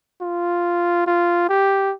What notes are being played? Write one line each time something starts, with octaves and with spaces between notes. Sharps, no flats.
F4
F4
G4